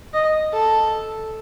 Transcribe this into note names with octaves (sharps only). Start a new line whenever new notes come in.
D#5
A4